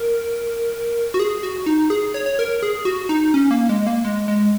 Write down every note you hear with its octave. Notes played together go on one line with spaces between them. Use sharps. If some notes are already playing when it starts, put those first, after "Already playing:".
Already playing: A#4
F#4
G#4
F#4
D#4
G#4
C#5
C#5
A#4
G#4
F#4
D#4
C#4
A#3
G#3
A#3
G#3
G#3